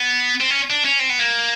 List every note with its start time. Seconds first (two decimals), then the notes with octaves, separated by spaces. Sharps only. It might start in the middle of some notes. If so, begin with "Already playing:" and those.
Already playing: B3
0.40 C4
0.50 C#4
0.70 D4
0.85 C#4
0.99 C4
1.09 B3
1.19 A#3